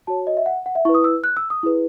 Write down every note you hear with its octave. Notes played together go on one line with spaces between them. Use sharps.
F#4 C#5 A5
D#5
E5
F#5
F#5
E5
E4 B4 C#6
D#6
E6
F#6
E6
D#6
E4 G#4 B4